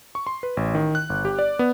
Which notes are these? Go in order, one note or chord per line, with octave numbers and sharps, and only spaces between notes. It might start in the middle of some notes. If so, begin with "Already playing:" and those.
C#6
C6
B4
A1
D#3
F#6
G1
G4
D5
B3